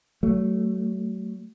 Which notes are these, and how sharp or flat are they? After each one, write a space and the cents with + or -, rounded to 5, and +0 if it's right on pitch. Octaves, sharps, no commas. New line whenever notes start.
F#3 +30 A3 +0